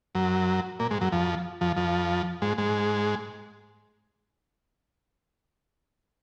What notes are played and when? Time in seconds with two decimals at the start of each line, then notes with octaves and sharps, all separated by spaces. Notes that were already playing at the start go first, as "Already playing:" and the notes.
0.15 F#2 F#3
0.80 A#2 A#3
0.91 G#2 G#3
1.01 F#2 F#3
1.12 F2 F3
1.61 F2 F3
1.76 F2 F3
2.42 G#2 G#3
2.58 G#2 G#3